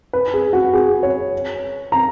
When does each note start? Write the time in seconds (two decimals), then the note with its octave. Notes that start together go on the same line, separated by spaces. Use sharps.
0.13 B4
0.34 G#4
0.53 F#4
0.73 G#4
1.03 C#5
1.92 A#5